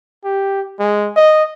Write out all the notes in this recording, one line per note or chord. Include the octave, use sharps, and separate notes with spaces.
G4
G#3
D#5